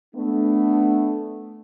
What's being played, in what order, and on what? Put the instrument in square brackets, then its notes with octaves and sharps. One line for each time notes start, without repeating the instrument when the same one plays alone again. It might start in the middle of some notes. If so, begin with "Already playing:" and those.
[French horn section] A3 B3 D4